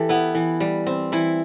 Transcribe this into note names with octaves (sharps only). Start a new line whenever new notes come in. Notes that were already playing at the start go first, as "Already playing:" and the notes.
Already playing: E3 G4 A4
B3 E4
E3
G3
C4
E3 E4